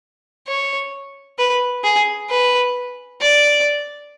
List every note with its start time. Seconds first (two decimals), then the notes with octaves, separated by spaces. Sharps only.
0.47 C#5
1.38 B4
1.84 G#4
2.30 B4
3.21 D5